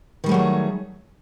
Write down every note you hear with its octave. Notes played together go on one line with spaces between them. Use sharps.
D#3 F#3 G3 A3 G#4